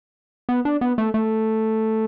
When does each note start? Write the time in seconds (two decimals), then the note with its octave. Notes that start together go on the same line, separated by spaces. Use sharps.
0.49 B3
0.65 D4
0.81 B3
0.98 A3
1.14 A3